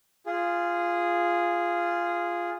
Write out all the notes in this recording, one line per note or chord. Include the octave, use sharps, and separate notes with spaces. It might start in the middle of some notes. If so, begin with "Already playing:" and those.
F4 G#4